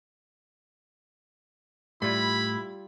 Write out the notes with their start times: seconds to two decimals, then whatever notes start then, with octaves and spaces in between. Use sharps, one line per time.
2.02 A2 G3 E4 F4 B5